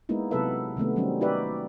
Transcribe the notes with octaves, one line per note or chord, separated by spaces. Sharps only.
G#3 A#3 B3 D#4 E4
C3 F#3 B3 A4 B4 E5
C3 D#3 A3 B3
D#3 F#3 G3 C4 C#4 D#4
D#4 F#4 G4 B4 D5 E5